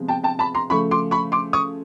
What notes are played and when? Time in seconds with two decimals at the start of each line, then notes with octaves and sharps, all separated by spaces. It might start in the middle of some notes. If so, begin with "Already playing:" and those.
Already playing: C3 F3 G#3 B3
0.08 G5 A5
0.24 G5 A5
0.39 A5 B5
0.55 A#5 C6
0.70 C#3 F3 A3 B5 C#6
0.91 C6 D6
1.11 B5 C#6
1.32 C6 D6
1.53 C#6 D#6